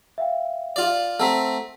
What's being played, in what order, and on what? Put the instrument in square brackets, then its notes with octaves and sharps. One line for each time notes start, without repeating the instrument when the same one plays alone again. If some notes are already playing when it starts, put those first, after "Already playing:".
[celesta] E5 F5 G5
[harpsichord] F4 D5
[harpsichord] A3 C4 [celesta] F#5 A#5 B6